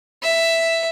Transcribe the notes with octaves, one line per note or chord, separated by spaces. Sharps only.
E5